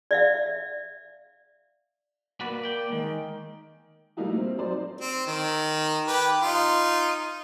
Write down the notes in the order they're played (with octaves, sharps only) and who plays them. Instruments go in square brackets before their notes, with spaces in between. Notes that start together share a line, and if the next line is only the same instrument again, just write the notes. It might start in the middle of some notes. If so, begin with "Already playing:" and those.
[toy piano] D5 E5 F5
[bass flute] A#3 [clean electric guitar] F#4 B4 D5
[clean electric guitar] D5 G5
[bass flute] D#3 [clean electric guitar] G#3
[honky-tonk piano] G3 A3 A#3 D#4 E4 F#4
C4
F#3 C4 D#4 C5 D5
[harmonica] C4
D#3
G4 B4 G5
D#4 F4